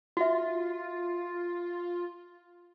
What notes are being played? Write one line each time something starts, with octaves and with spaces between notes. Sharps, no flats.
F4 F#4 E5